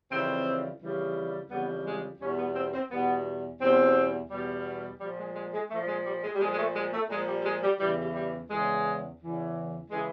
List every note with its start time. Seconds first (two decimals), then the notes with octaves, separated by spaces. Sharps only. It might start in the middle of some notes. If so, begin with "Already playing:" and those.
0.10 F2 C#3 E3 G3 C4
0.80 F2 C#3 E3 G3
1.50 F2 C#3 E3 G3 B3
1.85 G#3
2.20 E2 B2 G3 C#4
2.38 B3
2.56 C4
2.73 C4
2.90 E2 B2 G3 B3
3.60 E2 B2 G3 C4
4.30 E2 B2 G3
5.00 F3 G3
5.04 A#2
5.18 G#3
5.35 G#3
5.53 G#3
5.70 A#2 F3 A3
5.88 G#3
6.05 G3
6.23 G#3
6.35 G3
6.40 A#2 F3 G#3
6.52 G#3
6.57 A3
6.75 G#3
6.93 A3
7.09 A#2 F3 G#3
7.28 G3
7.40 G3
7.45 G#3
7.63 G3
7.79 E2 C#3 E3 G3
8.01 G3
8.14 G3
8.50 E2 C#3 E3 G#3
9.20 E2 C#3 E3
9.89 C#3 E3 G#3